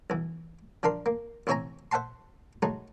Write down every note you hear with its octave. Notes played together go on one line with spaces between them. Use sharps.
B1 E3
F3 D4 A#4 C6
A#3
A1 C3 E4 C#5 G#5 A#5
C5 E5 F#5 A5 C6
F#3 G#3 A3 D#4